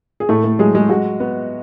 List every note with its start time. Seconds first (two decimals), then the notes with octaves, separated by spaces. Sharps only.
0.20 G#4
0.29 A2 A3 A4
0.44 A3 A4
0.59 F#3 G#3 G#4
0.75 G#3 G#4
0.89 G#3 F#4
1.20 B3